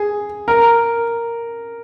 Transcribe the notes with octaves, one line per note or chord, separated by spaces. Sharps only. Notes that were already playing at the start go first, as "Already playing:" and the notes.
Already playing: G#4
A#4